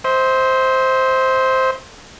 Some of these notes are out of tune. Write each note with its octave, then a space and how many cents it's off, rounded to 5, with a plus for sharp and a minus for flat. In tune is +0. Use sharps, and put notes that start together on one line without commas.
C5 +0 E5 -40